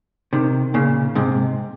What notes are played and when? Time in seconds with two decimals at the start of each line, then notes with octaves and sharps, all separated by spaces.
0.33 C3 D#3
0.74 A#2 C#3
1.15 G#2 C3